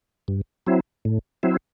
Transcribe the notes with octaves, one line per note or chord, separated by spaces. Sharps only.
G2
F#3 C4 E4
A2
F#3 C4 E4